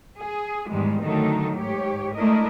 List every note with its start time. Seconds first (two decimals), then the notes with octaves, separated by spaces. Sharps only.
0.18 G#4
0.70 E2 G#2 D#3 G3 G#3
1.03 D3 D#3 F#3 A3 D#4 A4
1.55 G#2 G4 C#5
2.15 G#3 A3 D4 E4 A#4 D#5